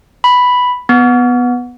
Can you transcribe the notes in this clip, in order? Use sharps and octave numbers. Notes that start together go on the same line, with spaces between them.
B5
B3